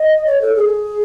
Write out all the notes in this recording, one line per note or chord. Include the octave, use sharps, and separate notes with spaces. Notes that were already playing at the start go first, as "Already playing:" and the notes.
Already playing: D#5
C#5
A4
G#4